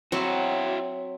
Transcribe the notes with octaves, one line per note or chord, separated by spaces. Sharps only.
F#3 C4 E4 F#4 C#5 E5